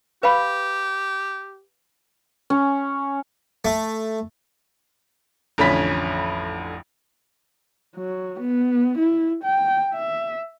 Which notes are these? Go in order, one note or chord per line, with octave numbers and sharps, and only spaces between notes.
G4 B4 F5 B5
C#4
A3
A1 F2 D3 C#4 B5 B6
F#3
B3
E4
G5
E5